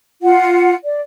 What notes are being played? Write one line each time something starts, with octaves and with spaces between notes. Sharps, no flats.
F4 F#5
D5